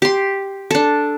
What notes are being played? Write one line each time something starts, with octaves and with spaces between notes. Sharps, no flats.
G4 C6
D4 A4